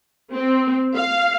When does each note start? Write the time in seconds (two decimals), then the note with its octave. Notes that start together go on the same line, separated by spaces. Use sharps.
0.33 C4
0.96 F5